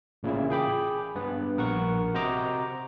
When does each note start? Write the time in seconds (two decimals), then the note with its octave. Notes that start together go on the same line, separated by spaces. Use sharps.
0.23 A1 A#2 C#3 A#3 E4
0.50 G#4 G5 B5 D6
1.15 G2 B3 B4
1.57 A#1 A#4 F#5 C#6
2.14 C3 F#4 C5 D#5 A#5 D6